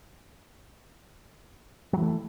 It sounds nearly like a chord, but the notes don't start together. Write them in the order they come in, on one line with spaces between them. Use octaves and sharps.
F#3 E3 A3